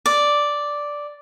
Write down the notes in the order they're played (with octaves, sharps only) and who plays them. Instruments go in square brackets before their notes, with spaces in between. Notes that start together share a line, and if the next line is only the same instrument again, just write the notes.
[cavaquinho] D5